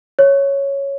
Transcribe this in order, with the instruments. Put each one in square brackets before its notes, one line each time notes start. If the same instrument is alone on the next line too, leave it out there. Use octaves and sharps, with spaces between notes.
[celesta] C#5